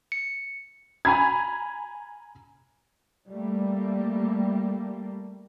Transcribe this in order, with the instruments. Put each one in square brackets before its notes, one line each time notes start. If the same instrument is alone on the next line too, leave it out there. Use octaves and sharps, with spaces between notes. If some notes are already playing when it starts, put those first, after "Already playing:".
[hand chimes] C#7
[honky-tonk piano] G#5 A#5 B5 G#6
[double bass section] G3 A3 A#3